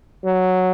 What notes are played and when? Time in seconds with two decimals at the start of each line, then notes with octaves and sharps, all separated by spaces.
0.25 F#3